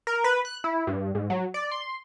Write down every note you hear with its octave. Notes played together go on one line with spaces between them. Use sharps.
A#4
B4
F#6
E4
G2
G#2
F#3
D5
C6